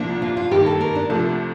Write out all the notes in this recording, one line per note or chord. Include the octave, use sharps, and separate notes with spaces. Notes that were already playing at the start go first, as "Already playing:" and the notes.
Already playing: C2 A#2 F3 A#3 D4
F4
F4
G2 D#3 A#3 G4
A4
A#4
D4
C2 C3 F3 A3 D4